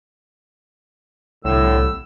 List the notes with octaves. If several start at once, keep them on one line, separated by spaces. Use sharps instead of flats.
C2 A2 D3 E6